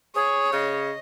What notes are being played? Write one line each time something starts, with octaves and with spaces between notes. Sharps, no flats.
G#4 C#5
C#3 D#5